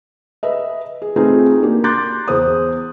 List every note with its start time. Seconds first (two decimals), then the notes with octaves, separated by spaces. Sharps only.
0.43 B4 D#5 E5
1.02 G#4
1.16 A3 C4 D#4 F4 G#4 B4
1.62 A#3 D4 F#4 G4
1.84 A#5 C6 D6 F#6 G6 A6
2.28 E2 C5 D#6